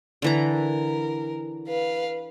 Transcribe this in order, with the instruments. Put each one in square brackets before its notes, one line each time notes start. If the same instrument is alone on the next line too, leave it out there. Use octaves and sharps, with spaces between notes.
[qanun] D3 E3 A#5
[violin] A#4
B4 F5